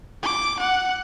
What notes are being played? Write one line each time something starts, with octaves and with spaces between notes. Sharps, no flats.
D6
F#5